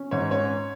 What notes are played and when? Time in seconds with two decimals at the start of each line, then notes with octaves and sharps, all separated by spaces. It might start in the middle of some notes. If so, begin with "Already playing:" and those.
Already playing: C#4
0.11 G#2 C#5
0.31 C#4 C#5